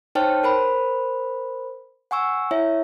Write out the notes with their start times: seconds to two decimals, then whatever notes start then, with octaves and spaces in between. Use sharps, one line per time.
0.15 D#4 C5 C#5 G5 A5 F6
0.44 A#4 C5 B5
2.11 F#5 G#5 C#6 E6
2.51 E4 C#5 E5